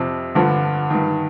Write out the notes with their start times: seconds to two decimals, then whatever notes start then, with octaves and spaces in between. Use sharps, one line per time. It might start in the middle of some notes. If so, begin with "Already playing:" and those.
Already playing: F2 C3 F3
0.35 G2 D3 F3
0.90 G2 D#3